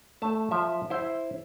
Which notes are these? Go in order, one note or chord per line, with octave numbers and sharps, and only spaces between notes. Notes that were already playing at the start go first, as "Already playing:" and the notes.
A3 A5
F3 E5
E4 C5